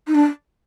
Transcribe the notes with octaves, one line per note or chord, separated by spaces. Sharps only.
D#4
D4